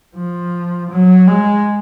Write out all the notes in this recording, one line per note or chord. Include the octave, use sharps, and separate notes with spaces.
F3
F#3
G#3